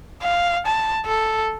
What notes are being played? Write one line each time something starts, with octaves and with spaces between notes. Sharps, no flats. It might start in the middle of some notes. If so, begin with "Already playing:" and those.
F5
A5
A4